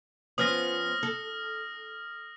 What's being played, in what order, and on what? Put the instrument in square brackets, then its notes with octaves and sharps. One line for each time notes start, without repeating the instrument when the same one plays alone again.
[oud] F3 B3 C#4 [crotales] D#6 F6 A#6
[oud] A4